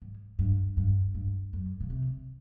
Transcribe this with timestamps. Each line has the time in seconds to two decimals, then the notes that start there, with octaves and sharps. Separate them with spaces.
0.02 G#2
0.39 G2
0.77 G2
1.15 G2
1.53 F#2
1.81 C#3
1.90 C3